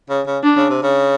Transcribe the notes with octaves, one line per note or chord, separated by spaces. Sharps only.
C#3
C#3
D4
C#3
C3
C#3